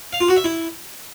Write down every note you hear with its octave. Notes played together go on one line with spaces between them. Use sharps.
F5
F4
F#4
E5
E4